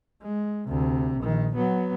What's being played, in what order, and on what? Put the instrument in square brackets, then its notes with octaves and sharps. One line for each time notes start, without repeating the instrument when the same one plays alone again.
[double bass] G#3
D2 C3
A#1 D#3
F#3 B3